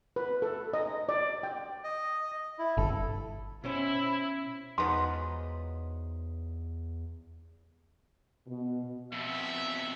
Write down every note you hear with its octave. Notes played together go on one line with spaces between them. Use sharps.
B4
A4
D#5
D5
G5
D#5
E4
G1 A4
B2 C#4 E4 C5
E2 F3 F#3 G#3 D#4 B4 C6
B2
F2 B2 E5